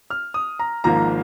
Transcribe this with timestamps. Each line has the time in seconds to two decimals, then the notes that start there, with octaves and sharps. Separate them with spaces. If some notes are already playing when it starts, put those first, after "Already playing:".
0.10 F6
0.34 D#6
0.59 A#5
0.84 G#1 G#2 F3 A#3 A#5